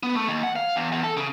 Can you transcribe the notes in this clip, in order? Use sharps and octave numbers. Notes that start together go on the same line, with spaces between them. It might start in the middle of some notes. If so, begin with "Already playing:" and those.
B3
A3
D#2
F#5
F5
E2
E2
A4
C#3